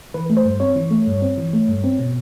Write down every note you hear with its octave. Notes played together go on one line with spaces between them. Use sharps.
E3 B4
A3
C5
G2
C4 C#5
E3
A3
G2
C4
E3
A3
G2
C4
B2